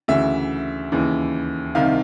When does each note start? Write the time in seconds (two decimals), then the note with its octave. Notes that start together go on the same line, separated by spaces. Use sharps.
0.08 D2 C#3 E3 E5
0.92 D#2 C#3 E3
1.75 C2 C3 D#3 F5